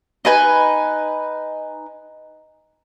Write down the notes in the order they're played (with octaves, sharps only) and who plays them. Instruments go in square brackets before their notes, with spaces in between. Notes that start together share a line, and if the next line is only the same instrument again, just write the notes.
[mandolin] D#4 B4 G#5